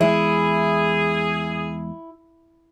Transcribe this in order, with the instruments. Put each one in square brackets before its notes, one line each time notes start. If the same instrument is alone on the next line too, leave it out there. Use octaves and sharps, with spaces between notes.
[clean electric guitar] E2 G#3 [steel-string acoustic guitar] E4 [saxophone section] G#4